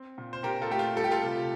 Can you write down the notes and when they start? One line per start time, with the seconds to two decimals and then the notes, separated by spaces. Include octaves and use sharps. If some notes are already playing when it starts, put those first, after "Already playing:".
Already playing: C4
0.18 A#2
0.33 C5
0.43 A#2 G4 A#4
0.62 F4 A4
0.71 A3 G4
0.79 F4
0.96 G3 A4
1.04 G4
1.11 F4 A4
1.23 C3